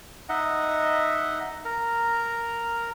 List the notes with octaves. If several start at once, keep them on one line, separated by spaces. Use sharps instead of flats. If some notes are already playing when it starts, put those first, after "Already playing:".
D#4 D#5 E5 F#5
A#4 A#5